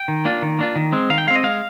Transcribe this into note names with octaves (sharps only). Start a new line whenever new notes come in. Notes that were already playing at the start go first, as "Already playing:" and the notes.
Already playing: G5
D#3
A#3 D4 F4
D#3
A#3 D4 F4
D#3
G#3 C4
D#3 F5
G5
G#3 C4 F5
D#5
G#3 F5